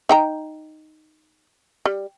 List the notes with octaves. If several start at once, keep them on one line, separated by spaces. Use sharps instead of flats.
D#4 G5 A#5
G3